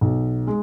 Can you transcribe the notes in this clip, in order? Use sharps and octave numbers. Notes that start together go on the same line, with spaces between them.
B1
G#3